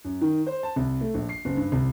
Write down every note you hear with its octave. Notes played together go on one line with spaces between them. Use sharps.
F#2
D#3
C5
A5
C2
A3
A#1
C7
F#1
G2
C2